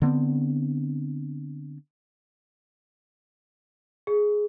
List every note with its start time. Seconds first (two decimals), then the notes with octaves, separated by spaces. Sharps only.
0.02 D3 B3 C4
4.07 G#4